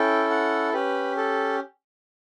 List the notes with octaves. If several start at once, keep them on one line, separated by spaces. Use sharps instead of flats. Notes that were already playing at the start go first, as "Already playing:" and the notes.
Already playing: C#4 E4 A4 G5
F#5
C#4 G4 B4
A4